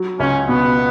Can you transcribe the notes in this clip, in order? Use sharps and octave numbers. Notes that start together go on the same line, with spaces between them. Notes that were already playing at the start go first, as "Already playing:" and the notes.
Already playing: F#3
C#2 C#4
B2 B3